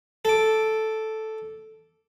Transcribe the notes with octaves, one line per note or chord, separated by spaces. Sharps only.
A4 D6